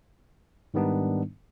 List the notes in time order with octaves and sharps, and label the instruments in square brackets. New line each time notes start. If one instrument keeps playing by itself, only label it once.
[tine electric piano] G#2 D#3 G3 B3 D4 D#4